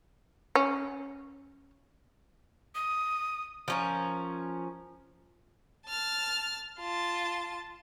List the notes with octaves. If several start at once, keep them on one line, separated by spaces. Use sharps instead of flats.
C#4
D#6
F3 C#4 A#4
A5 F6
F4 A5